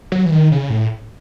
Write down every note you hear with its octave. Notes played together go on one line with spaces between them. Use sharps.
F#3
E3
D#3
C#3
A2